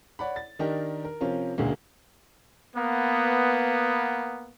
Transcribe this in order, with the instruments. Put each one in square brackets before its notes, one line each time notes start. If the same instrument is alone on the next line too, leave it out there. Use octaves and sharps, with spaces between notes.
[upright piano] C#5 D5 F#5 B5
A6
D#3 D4 D#4 G4 A#4
A#4
C3 F3 C#4 F4 A#4
E1 D2 C#3 G#3 A#3
[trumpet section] A#3 B3